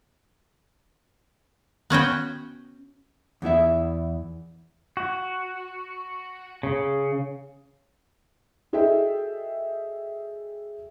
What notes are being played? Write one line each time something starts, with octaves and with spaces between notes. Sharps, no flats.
B3 C#4 F#4 G5
E2 B3 E4 E5
F#4
C#3
F#4 G#4 A4 D#5 E5 G5